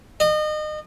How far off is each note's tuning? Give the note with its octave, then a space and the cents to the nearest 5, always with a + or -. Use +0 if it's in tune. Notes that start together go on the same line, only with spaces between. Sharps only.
D#5 -30